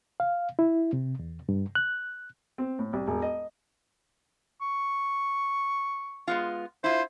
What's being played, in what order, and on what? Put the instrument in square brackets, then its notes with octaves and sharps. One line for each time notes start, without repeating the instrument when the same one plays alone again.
[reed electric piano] F5
E4
C3
E2
G2
F#6
[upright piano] C4
A2
C2
E1
D#5
[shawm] C#6
[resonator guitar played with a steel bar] G#3 B3 F4
[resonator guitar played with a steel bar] E4 F4 [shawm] C5